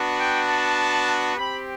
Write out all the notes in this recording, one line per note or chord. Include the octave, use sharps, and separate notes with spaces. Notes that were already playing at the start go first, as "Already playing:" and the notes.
Already playing: B3 D4 F#4
G5
A5
C4 G4 B5